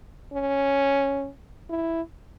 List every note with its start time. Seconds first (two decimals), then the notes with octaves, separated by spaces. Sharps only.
0.33 C#4
1.70 E4